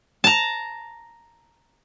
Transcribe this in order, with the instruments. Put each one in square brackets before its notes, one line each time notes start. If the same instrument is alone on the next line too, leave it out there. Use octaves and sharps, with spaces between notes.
[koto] A5 A#5